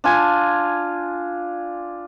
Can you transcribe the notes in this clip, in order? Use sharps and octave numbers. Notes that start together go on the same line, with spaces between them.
D4 F4 G#5